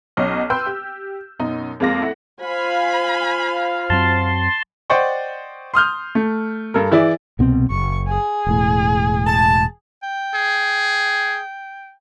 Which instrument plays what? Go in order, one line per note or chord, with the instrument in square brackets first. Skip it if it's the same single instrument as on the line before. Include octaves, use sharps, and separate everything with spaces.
[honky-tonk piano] B1 F#3 C#4 D#5 F6
B4 G5 C6 E6 G6
G4
F#2 B2 D#4
F2 G#3 A#3 F4 D6 A#6
A3 E4 F#5
[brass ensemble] F4 C5 F5 [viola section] G#5 B5
[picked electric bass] F#2 F#3 C4 [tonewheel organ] A5 C6
[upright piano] C5 D5 D#5 F#5 G5 C#6
C6 D#6 F6 G6
A3
G2 A4 A#4
E3 E4 G#4 D5 E5
[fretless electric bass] C2 B2 C4
[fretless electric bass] F#1 [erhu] C#6
[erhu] G#4
[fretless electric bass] E1 A2
[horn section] A5
[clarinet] G5
[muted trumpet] G#4